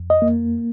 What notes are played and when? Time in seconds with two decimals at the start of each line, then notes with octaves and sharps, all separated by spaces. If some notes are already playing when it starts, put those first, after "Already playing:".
Already playing: F2
0.10 D#5
0.22 A#3